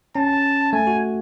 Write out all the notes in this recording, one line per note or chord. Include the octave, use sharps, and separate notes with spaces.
C#4 A5
A3 G#5
F#4